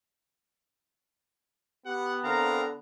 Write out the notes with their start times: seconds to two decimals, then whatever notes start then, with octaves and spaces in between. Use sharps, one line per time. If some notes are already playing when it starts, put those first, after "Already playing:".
1.86 B3 G4 F#5
2.24 D3 C4 A#4 F5 A#5